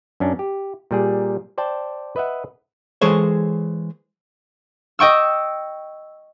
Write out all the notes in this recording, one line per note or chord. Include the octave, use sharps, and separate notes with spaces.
F#2 C#4 D4
G4
A#2 G3 G#4
C5 D5 G5 A5
B4 D#5 E5 F#5
E3 G#3 G#4 A4 C5 C#5
D#5 G5 C#6 E6